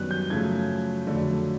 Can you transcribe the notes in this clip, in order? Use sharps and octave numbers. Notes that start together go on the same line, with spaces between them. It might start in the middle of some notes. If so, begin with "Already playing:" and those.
Already playing: F#2 D#3 G3 B3 F#6
G6
F#2 C#3 F3 A3 G#6
F2 D3 F#3 A3